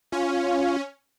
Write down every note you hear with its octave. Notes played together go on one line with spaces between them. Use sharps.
C#4 F4